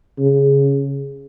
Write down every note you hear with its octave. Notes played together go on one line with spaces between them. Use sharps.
C#3